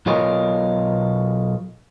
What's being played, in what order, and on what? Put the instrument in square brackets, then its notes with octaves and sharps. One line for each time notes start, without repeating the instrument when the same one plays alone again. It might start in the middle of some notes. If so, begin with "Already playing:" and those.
[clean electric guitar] B1 B2 F4 A#4 C#5 D#5